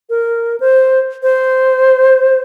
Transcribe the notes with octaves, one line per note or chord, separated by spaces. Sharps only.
A#4
C5
C5